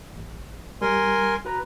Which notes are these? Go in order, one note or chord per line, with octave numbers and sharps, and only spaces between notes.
A1
G3 A#4 G#5 C6
F#4 B4 A#5